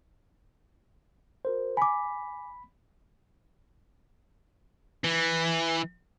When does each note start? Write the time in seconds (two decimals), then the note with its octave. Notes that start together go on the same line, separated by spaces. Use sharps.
1.45 F#4 A#4 C5
1.77 G#5 B5 D6 B6
5.04 E3